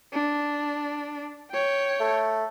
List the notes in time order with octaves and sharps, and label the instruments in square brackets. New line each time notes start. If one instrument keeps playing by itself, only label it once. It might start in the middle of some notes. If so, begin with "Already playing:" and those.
[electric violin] D4
C#5 G5
[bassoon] A3